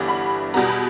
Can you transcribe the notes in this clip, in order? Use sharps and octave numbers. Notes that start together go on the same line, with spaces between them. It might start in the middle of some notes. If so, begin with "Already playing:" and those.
Already playing: G1 G2 E3 G3 B3
B5
E2 B2 G3 B3 A#5
B5